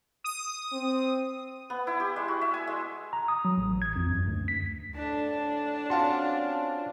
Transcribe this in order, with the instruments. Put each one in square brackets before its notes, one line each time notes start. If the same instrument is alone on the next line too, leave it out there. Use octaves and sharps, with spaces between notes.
[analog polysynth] D#6
[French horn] C4
[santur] B3
E4
G4
G#3
F#4
E5
G#5
G#3
[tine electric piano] A#5
D#6
F#3
A1
G#6
F2
F#2
D2
B6
[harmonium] A2 A5 [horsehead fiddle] D4
[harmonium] C4 C#4 F4 [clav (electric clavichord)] F#4 [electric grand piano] F5 A5 C6